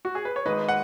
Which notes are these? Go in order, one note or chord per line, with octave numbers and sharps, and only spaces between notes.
F#4
G#4
B4
C#5
G#1 G#2 G#3 B4 D#5
F#5